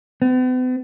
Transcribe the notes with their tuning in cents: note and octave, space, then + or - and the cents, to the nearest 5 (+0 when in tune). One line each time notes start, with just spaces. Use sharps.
B3 +45